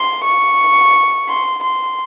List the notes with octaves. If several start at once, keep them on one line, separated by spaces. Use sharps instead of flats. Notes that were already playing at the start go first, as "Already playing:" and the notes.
Already playing: C6
C#6
C6
C6